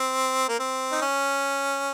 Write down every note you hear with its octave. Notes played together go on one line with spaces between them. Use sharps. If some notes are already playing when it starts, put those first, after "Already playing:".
Already playing: C4
A#3
C4
D#4
C#4